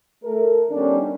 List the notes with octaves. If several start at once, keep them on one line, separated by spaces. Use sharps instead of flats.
A3 A4 A#4
D#3 G3 B3 C#4 D4